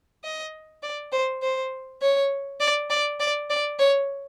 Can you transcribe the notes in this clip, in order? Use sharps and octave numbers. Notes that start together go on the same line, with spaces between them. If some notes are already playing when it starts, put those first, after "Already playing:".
D#5
D5
C5
C5
C#5
D5
D5
D5
D5
C#5